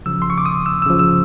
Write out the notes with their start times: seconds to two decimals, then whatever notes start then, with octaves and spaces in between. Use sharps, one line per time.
0.06 C#3 F3 E6
0.22 C6
0.30 C#6
0.38 D6
0.46 D#6
0.66 E6
0.82 E6
0.86 C#3 F3
0.99 E6